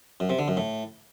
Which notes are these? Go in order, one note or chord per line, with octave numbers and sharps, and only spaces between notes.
F#2
C3
D3
F#2
A2